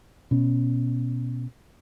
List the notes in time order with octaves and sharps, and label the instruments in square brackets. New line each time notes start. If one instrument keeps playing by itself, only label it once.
[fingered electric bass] B2 C#4